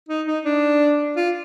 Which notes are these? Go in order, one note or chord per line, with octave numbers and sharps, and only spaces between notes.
D#4
D#4
D4
F4